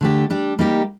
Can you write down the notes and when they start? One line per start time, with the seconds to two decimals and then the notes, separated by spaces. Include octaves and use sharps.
0.01 D3 A3 D4 G4
0.30 G3 D4 G4
0.59 G3 A#3 D#4 G4